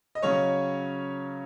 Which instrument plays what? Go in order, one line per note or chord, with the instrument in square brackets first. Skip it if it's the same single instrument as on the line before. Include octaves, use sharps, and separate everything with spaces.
[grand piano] D#5
C#3 F#3 C#4 C#5